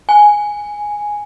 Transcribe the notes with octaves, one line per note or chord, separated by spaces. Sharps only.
G#5